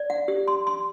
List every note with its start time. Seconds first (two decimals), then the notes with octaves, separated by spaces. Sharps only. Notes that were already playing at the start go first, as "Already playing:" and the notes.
Already playing: D5
0.10 F#5
0.28 G4
0.48 C6
0.67 C6